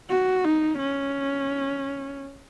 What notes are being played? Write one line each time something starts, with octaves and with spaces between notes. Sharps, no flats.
F#4
D#4
C#4